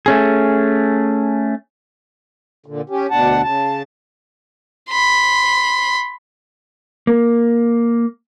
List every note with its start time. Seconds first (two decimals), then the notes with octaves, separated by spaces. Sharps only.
0.06 A3 C#4 G#4
2.66 A#2 D3
2.90 C#4 G4
3.11 D2 B2 D4 F#5 A5
3.42 C#3 A5
4.89 B5 C6
7.07 A#3